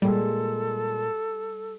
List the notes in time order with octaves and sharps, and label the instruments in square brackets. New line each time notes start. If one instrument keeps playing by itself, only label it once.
[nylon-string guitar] A#2 G#3 [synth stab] G3 [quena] A4